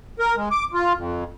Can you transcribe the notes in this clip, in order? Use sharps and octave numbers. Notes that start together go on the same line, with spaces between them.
A#4
G#3
D6
F4
F2